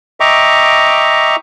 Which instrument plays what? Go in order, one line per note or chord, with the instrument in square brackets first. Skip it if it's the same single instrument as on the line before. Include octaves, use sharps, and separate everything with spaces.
[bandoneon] D#5 E5 G5 A#5 C#6 D6